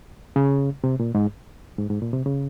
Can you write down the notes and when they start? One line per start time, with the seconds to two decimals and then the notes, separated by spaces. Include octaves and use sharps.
0.36 C#3
0.84 C3
1.00 A#2
1.15 G#2
1.78 G#2
1.90 G#2
2.02 A#2
2.13 C3
2.26 C#3